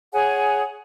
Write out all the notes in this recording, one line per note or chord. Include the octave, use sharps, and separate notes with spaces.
G#4 C#5 F#5 G#5